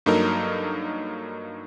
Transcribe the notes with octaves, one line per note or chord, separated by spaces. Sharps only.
G2 F#3 A#3 D#4 A4 A#4